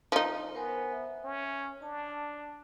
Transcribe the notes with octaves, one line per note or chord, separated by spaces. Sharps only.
F3 D#4
B3 A#4 C5 G#5
E5
C#4
D4 A5